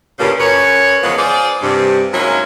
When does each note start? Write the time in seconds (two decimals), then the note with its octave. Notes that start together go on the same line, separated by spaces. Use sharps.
0.19 G2 A#2 C#3
0.39 F#2 B4 C#5
1.03 E2 C#3 F3 G#3 B3
1.18 F4 G#4 C5 D5
1.62 G2 C3
2.14 F#3 G#3 A#3 C#4 D#4 E4